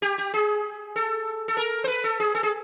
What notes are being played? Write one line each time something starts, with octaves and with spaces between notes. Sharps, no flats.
G4
G4
G#4
A4
A4
A#4
C5
B4
A4
G#4
A4
G#4